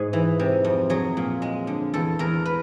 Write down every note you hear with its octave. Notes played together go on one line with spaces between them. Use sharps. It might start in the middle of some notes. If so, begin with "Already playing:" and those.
Already playing: G#2 G#4
E3
C3
F2
F#3 G#4
A#2
G#3
D3
E2 A4
E2 A#4
B4